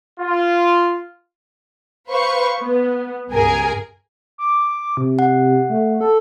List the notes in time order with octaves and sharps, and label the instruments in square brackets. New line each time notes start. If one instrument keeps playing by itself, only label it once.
[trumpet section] F4
[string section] B4 C5 F5 C#6
B3
C#2 G2 G#4 A#4 G#5
[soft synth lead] D6
C3
[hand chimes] F#5
[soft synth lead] A3
A4